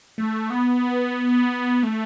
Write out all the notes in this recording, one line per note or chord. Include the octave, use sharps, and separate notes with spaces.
A3
B3
A3